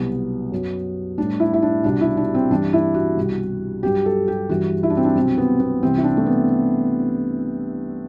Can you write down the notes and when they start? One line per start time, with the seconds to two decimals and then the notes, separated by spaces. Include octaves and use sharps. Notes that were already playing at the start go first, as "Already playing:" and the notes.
Already playing: C2 B2 F#3 B3
0.52 F#2 F#3
1.18 A2 G3 D4
1.40 E4
1.53 E4
1.62 D4
1.84 C2 B2 G3 D4
2.01 E4
2.17 D4
2.34 C4
2.51 G2 E3 G3 D4
2.73 E4
2.94 F#4
3.17 C2 B2 G3
3.83 G2 F#3 G4
4.06 A4
4.28 G4
4.49 G2 E3 G3 F#4
4.83 E4
4.90 D4
4.97 C4
5.04 D4
5.15 C2 B2 F#3 C4
5.38 B3
5.60 B3
5.82 C2 C3 E3 C4
5.97 E4
6.04 D4
6.17 A3
6.26 B3